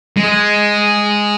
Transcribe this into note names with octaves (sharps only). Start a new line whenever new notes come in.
G#3